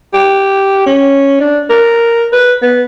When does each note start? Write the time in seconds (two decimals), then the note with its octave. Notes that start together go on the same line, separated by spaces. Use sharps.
0.14 G4
0.86 C#4
1.40 D4
1.70 A#4
2.32 B4
2.62 B3